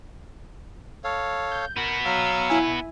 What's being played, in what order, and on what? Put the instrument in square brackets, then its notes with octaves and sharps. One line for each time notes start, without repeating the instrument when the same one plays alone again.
[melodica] A4 C#5 F5
[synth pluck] G6
[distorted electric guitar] B3 F#4 [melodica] A#4
[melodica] F#3 F5 E6
[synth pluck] E4 E5 G#5